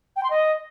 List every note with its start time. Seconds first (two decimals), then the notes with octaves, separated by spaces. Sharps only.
0.16 G5
0.23 C6
0.30 D#5